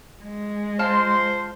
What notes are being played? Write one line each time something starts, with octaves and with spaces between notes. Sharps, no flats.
G#3
F4 C5 A5 C6